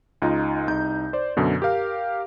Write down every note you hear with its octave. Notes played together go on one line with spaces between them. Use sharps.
C#2 D#4 F4
C2 D#4 G6
C5 D5
F#2 B2 D3
G4 A#4 F5